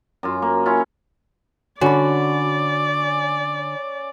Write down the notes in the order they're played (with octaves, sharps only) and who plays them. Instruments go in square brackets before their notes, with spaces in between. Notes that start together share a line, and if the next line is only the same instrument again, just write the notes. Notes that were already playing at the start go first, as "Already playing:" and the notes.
[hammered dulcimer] F#2 F4
A#3
C#4 E4 F4
[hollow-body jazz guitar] D3 [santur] C#4 B5 [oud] F#4 [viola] D5